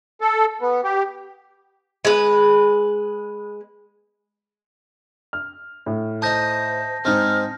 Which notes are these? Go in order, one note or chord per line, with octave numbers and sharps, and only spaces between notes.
A4
B3
G4
G#3 B4
F6
A2
D#4 C5 A5 D#6 G6 A#6
G#2 G#3 C4 D#4 F6